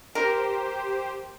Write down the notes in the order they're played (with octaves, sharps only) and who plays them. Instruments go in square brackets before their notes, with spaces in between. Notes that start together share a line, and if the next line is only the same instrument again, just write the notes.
[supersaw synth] G4 C5 [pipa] A#4